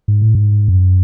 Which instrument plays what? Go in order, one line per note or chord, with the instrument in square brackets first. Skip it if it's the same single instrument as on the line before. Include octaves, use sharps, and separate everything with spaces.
[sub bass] G#2
A2
G#2
F#2